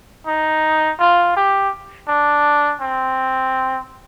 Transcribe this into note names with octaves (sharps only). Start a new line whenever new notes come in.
D#4
F4
G4
D4
C4